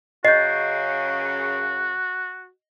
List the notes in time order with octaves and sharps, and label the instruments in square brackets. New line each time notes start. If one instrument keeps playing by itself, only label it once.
[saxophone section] F#2 C#3 [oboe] F#4 [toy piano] D#5 [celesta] G6 C7